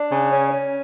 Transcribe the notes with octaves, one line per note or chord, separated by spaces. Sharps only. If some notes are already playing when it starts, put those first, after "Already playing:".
Already playing: D4
C#3
C#4
C#4